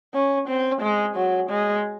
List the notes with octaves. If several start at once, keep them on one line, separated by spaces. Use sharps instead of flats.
C#4
C4
G#3
F#3
G#3